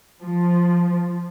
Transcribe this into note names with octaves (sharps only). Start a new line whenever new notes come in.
F3